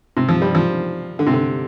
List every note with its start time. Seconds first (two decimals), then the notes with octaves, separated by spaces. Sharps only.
0.17 C3
0.29 F3
0.42 G3
0.55 F3
1.19 D3
1.27 C3
1.33 D3